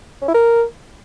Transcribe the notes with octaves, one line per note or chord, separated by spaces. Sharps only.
C#4
E4
A#4